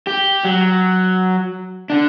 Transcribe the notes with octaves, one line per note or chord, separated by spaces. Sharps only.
G4
F#3
D3 D4